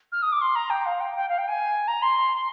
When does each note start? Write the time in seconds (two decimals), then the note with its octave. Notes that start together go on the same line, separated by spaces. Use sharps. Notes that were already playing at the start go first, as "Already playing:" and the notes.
0.12 F6
0.22 D#6
0.32 D6
0.41 C6
0.55 A#5
0.70 G5
0.86 F5
1.00 G5
1.15 G5
1.29 F5
1.38 G5
1.48 G#5
1.88 A#5
2.02 C6